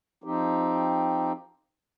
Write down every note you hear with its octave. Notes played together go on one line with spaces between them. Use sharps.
F3 C4 D#4 G4